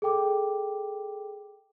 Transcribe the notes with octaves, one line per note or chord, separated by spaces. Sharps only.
G#4 A4 G5 D6